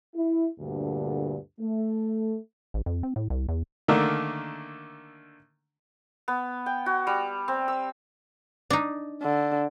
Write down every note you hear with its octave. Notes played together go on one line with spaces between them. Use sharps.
E4
D2 G2 A#2 D3
A3
A1
F2
C4
A2
C2
E2
D3 D#3 A3 A#3 D4
B3
G5
F#4
G3
C4
E6
D4 D#4
D3